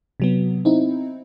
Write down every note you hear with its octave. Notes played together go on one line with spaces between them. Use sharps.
C3 F#3 B3
C4 D#4 E4